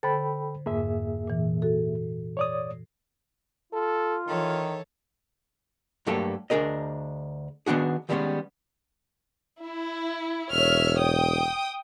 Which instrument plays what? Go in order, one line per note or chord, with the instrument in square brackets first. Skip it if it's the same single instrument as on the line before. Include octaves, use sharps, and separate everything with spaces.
[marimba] D3 C5 A6 [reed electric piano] A4 G5 B5
[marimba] F2 G#2 [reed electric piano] A#3 G#4 E5
[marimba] A#2 E3
F#4 A4
[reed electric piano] C#5 D5 D#6
[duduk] F4 [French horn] A4
[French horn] D#3 [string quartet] E3 A4 C#5
[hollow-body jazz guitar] G2 F#3 A3 A#3 G4 A4
D2 D4 G#4 A#4 D#5
D#3 B3 D4 F#4 G#4
D#3 G3 G#3 A#3 B3 C#4
[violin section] E4
[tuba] E1 [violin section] C#5 E5 F6
[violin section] G5 D#6